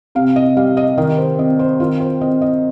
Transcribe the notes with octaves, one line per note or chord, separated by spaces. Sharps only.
C3 F5
D#5
G3 F5
D#5
D#3 D#5
C5
C4 D#5
C5
D#3 F4
C5
C4 D#5
D#5